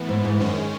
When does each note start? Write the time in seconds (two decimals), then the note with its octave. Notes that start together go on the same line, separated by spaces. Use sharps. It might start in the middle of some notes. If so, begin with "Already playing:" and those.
Already playing: A2 E3 B3
0.09 G#2
0.25 G#2
0.40 F#2 D#3 G#3 C#4